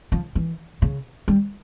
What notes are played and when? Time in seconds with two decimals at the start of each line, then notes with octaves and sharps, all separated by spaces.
0.12 F3
0.35 E3
0.82 C#3
1.28 G3